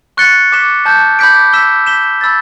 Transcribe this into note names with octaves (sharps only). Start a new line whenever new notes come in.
C#6 F#6 A6 C#7 G7
D6 F#6 B6 E7 G7
A5 E6 G6
B5 D6 G6 B6 D7
E6 B6 E7 G7
G6 B6 E7 G7
B5 E6 A6